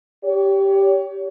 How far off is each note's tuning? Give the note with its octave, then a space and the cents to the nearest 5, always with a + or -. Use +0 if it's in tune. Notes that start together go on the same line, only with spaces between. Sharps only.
G4 +0 C#5 +35